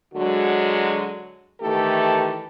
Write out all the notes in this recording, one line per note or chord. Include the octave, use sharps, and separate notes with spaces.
D3 F#3 G#3 F#4
D#3 E3 A3 G4 A4